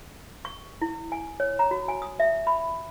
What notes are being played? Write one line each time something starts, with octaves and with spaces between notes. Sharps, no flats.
C#6
E4
G#5
C#5
A#5
F#4
G#5
D#6
E5
B5